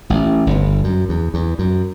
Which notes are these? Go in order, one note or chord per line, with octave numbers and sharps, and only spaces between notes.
A1 A2
G1 G2
F#2
E2
E2
F#2